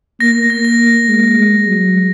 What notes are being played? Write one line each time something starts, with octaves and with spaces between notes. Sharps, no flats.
A#3 A#6
A#6
A#6
A#3
G#3
G#3
F#3